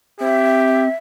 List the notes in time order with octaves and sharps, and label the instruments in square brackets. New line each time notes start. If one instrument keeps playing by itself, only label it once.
[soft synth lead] C4 [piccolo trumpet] G4 [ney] E5